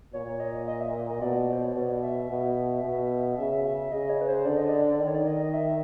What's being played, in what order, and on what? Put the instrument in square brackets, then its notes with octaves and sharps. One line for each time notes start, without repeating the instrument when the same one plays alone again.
[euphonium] A#2 [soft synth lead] C#5
[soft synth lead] D#5
D#5
E5
D#5
D#5
[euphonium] B2 [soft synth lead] D5
[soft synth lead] C5
C#5
[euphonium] B2 [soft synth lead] D5
[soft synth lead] E5
[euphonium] B2
B2
[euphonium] C#3 [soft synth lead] E5
[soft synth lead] E5
[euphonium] C#3 [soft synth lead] D#5
[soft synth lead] C#5
B4
C5
[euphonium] D3 [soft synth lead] D5
[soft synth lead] D#5
D5
[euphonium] D#3 [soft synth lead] D5
[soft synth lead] C#5
D5
D#5
D#5
E5